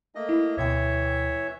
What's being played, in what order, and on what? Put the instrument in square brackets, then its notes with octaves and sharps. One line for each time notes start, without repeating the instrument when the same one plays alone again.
[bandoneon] A3 A#3 D#5
[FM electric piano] E4
[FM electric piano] D2 B2 G5 [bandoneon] E3 C#5 E5